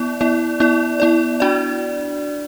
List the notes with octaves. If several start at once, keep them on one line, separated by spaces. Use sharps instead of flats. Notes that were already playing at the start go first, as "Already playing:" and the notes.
Already playing: B3 E4 D5
B3 E4 D5
B3 E4 D5
B3 E4 D5
D4 F#4 D5